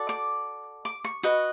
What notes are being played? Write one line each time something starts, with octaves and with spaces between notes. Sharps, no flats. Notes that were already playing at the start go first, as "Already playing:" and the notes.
Already playing: F#4 A4 D5
D6
D6
C#6
F#4 B4 D#5